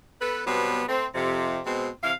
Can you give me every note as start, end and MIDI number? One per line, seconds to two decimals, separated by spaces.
0.21 0.41 59
0.21 0.41 69
0.21 0.41 71
0.46 0.83 47
0.46 0.83 54
0.46 0.83 55
0.46 0.83 59
0.46 0.83 60
0.89 1.05 57
0.89 1.05 60
1.15 1.59 41
1.15 1.59 48
1.65 1.89 47
1.65 1.89 56
1.65 1.89 60
2.03 2.12 48
2.03 2.12 52
2.03 2.12 77